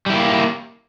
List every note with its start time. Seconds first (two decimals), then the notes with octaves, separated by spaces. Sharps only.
0.06 G3
0.10 E4
0.13 A#3